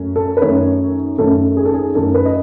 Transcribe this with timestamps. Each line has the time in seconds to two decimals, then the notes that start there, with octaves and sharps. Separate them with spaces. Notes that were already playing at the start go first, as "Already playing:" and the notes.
Already playing: F#2 A3 C#4
0.16 A4
0.37 B4
0.41 F#2 D#3 A3 C#4 C#5
1.18 F#2 D#3 A3 C#4 A4
1.57 G#4
1.65 A4
1.74 G#4
1.95 F#2 D#3 A3 C#4 A4
2.14 B4
2.25 D#5